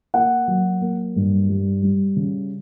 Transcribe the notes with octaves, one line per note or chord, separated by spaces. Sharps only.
A#3 F#5
F#3
A#3
G2
G3
G3
C#3